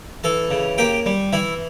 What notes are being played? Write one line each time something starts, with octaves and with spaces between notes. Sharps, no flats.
E3 A4 A5
C#3
A#3 G4 G5
G3
E3 E4 E5